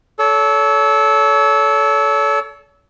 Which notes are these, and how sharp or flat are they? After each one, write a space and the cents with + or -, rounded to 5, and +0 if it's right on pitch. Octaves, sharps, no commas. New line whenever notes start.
A4 -15 C#5 +35